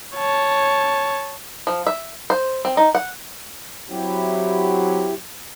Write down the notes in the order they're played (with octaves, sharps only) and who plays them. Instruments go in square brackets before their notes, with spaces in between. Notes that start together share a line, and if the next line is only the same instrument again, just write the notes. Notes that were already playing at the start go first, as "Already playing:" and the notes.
[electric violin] C#5 A5
[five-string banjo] F3
E5
C5
C4
D#4
F#5
[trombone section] F#3 C4 F#4 [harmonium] E4 G4